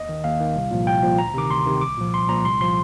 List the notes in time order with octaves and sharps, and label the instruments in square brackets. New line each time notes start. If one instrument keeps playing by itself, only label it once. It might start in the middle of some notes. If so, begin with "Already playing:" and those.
Already playing: [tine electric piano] D#2 D#5
D#3
D#2 F5
D#3
C2
A#2 F3
C2 G5
A#2 F3
D2 A#5
C3 D#3 D6
D2 C6
C3 D#3
C2 D6
A#2 F3
C2 C6
A#2 F3 A#5
C2 C6
A#2 F3 C6